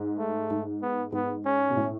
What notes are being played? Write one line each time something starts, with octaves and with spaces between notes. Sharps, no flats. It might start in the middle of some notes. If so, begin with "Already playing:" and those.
Already playing: G#2
A3
G#2
B3
G#2 B3
C#4
B2
A2